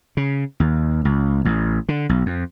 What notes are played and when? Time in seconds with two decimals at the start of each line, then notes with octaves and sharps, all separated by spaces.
0.17 C#3
0.60 D#2
1.05 C#2
1.45 A1
1.89 D3
2.09 B1
2.26 F2